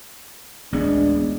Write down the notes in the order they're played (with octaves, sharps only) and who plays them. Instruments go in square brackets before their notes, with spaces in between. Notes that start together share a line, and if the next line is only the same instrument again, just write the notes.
[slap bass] A1 D2 B3 [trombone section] G#3 D4